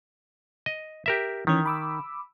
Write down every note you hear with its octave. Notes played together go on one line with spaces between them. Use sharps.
D#5
G4 A#4 E5
D#3 E3 C#4
B5 D6 E6